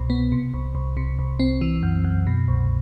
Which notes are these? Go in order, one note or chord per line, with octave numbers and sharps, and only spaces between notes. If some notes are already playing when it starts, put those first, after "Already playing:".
Already playing: C2 B2
B3
C3
C2
C2
C3
C2
C4
E3
F#2
F#2
B2
C2